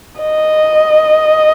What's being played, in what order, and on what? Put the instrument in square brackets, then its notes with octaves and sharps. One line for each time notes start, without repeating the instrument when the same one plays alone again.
[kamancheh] D#5